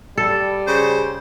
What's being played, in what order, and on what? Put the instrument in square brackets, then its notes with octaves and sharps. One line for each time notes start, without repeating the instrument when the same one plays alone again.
[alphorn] G3 [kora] A4
[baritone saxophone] C#3 [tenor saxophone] C5